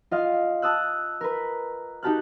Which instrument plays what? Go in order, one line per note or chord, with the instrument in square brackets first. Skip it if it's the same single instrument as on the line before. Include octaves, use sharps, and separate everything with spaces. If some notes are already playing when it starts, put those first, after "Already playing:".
[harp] F4 D#5 F5
A5 D#6 E6 F#6
A#4 B4
D#4 F#4 G4 A5 F6 F#6